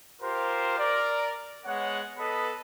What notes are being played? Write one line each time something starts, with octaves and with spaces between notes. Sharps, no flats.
F4 G4 A#4 C5
A#4 D5
G#3 B3 C#5 F#5
B3 A4 B4 D#5 B5